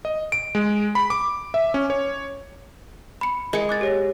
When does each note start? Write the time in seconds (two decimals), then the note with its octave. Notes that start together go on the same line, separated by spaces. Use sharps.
0.05 D#5
0.32 D7
0.55 G#3
0.95 B5
1.10 D6
1.54 E5
1.74 C#4
1.90 C#5
3.21 B5 C#7
3.53 G#3 A#4 C#7
3.69 D6 F#6 A6
3.81 G4 C#5 A#6